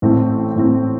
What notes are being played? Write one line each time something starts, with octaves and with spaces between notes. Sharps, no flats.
A1 A2 A3 C4
A1 A2 A3 C4